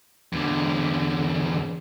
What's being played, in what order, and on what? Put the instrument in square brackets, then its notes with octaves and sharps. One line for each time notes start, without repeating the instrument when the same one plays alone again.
[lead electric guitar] E2 D3